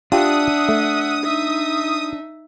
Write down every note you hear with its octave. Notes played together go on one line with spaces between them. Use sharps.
D4 F4 G4 E5 F#5 D#6
A3
D#4 E5